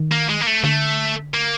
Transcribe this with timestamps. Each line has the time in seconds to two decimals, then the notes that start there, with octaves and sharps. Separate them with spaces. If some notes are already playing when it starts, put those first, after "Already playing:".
Already playing: D#3
0.11 A#3
0.29 G#3
0.41 A#3
0.46 A3
0.64 D3 A3
1.34 A#3